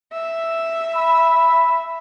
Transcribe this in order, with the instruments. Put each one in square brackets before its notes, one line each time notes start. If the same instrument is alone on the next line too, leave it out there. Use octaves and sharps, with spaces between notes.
[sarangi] E5
[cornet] B5